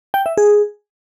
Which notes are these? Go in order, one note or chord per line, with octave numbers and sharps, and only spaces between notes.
G5
E5
G#4